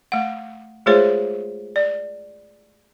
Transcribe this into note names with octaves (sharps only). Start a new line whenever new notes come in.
A3 F#5
G#3 A3 F4 G#4 C5 C#5
D5